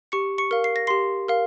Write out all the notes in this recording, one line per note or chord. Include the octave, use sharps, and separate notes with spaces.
G4 C#6 C#7
C#6 C#7
A#4 F5
C7
A#6
G4 C6 C7
A#4 F5